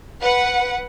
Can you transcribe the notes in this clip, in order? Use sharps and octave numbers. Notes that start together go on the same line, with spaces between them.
B4 F#5